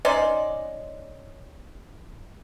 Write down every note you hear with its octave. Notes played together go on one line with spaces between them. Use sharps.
C#4 D#4 C5 D5